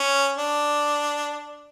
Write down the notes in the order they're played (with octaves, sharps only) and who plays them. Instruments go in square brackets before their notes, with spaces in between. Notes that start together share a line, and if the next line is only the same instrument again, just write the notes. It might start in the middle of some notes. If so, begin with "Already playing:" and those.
Already playing: [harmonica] C#4
D4